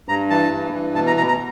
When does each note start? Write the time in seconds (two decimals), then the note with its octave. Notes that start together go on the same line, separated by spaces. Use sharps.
0.09 G2 A#5
0.30 E3 A5
0.51 G2
0.73 E3
0.95 B2 A5
1.07 A#5
1.17 B2 A#5
1.28 A#5